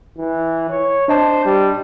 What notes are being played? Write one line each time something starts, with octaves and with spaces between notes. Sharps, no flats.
E3
C#5
D4 C5 D#5 A5
G3